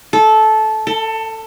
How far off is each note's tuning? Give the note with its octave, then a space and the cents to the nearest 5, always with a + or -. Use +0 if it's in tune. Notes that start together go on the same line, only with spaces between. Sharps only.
A4 -15
A4 +20